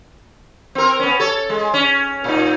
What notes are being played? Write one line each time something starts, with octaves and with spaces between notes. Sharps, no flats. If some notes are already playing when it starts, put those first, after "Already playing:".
C4 A#4
B3 C#4
A4 C#5
G#3
C#4
A#2 D#4